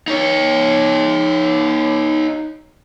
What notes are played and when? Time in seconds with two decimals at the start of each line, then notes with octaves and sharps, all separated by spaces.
0.08 D#4 C#5